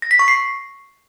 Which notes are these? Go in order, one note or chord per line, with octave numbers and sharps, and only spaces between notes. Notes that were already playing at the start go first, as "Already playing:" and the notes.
A#6
B6
C#6
C7